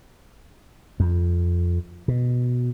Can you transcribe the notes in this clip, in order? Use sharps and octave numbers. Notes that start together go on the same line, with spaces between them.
F2
B2